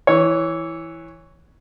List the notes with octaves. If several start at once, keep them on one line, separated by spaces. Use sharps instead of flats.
E3 C#5